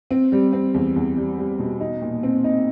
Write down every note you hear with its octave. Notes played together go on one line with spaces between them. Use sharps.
C4
G3
C4
E2
E2
G3
G3
B2
D#4
A#2
C4
D#4